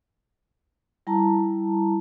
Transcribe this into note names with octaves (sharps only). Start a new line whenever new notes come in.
G3 E4 A5 A#5